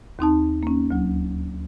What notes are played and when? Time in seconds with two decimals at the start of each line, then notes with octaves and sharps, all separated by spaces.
0.19 D#2 C4 D#4 A5
0.63 A#3 C#4
0.91 D2 F#3